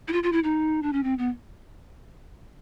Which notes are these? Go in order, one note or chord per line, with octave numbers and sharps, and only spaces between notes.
E4
F4
F4
E4
D#4
D4
C#4
C4
B3